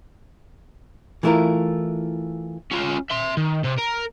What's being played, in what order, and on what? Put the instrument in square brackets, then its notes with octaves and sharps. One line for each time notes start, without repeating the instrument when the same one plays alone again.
[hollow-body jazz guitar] E3 A3 E4 F4 A#4
[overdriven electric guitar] C#4 F4
E5 C6
D#3
C3
A#4